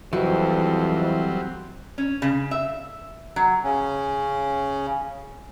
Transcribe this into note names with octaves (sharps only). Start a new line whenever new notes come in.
F2 E3 F#3 G3 C4 F#4
C#4
C#3
E5
F#3
C#3 C#4